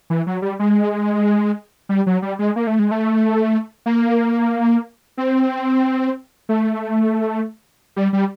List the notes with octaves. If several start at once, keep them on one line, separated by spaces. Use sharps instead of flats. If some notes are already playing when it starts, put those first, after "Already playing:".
E3
F#3
G3
G#3
G3
F#3
G3
G#3
A#3
A3
G#3
A3
A#3
C4
A3
G3
G3